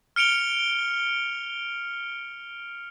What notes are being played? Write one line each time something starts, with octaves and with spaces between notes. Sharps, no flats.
F6 C#7 D7 F7 G7